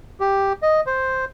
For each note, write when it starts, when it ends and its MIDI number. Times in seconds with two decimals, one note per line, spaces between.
0.20 0.53 67
0.63 0.81 75
0.87 1.25 72